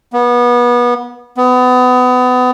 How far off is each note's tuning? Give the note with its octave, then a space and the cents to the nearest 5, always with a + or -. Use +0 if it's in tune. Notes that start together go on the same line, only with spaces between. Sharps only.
B3 -25
B3 +30